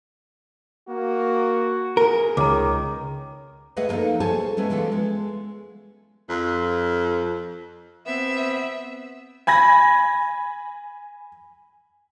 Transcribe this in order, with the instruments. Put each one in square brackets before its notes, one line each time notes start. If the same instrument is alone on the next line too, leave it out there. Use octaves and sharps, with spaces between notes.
[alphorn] A#3 [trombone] F#4
[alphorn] G#4 [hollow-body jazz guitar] A#4
[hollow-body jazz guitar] C#2 [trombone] D#3 [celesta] A#5 D6
[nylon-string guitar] A3 G#4 B4 D#5 F#5
D3 F3 A#3 D#4 A4
G#4 A4 C5 C#5 G#5 A5
G#3 A3 B3 C#4
E3 F3 B3 C#4 A4
G#3
[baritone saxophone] F2
[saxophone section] B3 C4 [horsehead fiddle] E5
[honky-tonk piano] G#5 B5 G#6 A#6